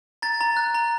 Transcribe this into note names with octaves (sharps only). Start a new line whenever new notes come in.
A#5 A6
A#5
F#6
A#5